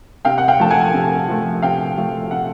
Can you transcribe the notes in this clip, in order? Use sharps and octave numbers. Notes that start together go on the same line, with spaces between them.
C3 F5 G5
F#5
F5 G5
F3 A3 A5
F#5 G#5
C3
F3 A3
C3 F5 G5
F3 A3
C3 E5 F#5